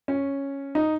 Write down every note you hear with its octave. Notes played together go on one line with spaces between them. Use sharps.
C#4
D#4